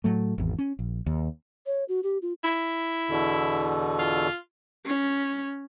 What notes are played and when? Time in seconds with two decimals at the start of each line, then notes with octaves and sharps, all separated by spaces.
0.04 A2 F#3 A3
0.38 G#1 E2
0.58 C#4
0.79 A#1
1.06 D#2
1.66 C#5
1.89 F#4
2.03 G4
2.22 F4
2.44 E4
3.09 E2 B2 D3
3.99 F4
4.85 C#4